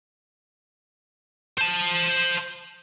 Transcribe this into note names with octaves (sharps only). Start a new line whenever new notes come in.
C5 A5